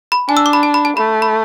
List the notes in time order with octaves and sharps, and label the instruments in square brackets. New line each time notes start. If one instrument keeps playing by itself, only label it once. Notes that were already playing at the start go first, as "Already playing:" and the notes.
[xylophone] B5
[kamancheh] D4 [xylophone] G#5
[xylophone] E6
D6
B5
A5
B5
A5
[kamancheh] A3 [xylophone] B5
[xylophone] B5